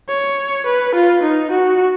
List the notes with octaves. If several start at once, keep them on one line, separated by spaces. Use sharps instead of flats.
C#5
B4
F4
D#4
F#4